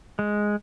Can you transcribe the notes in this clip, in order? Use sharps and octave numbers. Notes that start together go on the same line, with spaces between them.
G#3